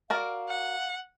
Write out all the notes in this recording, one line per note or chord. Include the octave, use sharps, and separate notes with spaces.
F#4 A#4 D5 F5
F#5